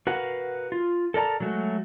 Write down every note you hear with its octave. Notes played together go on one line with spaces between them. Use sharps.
F#4 A#4 B4 F5 F#5
F4
A4 A#4 D5 A5 A#5
F#3 G#3 A3 F#4